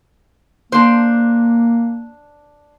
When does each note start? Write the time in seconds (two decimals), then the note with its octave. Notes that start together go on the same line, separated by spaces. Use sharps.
0.72 A#3 D4 C5